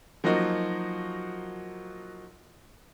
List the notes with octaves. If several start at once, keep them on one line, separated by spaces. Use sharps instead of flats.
F3 F#3 A#3 D#4 F#4